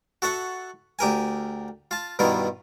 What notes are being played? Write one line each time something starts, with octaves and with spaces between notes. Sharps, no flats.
F#4 A4 E5 F#5
D2 G4 A#4 G#5
F4 A5
G2 B2 D#3 E4 F4